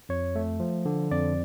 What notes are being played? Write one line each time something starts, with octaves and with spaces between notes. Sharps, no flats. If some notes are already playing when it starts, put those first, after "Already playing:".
F2 C#5
A3
F3
D3
F2 D5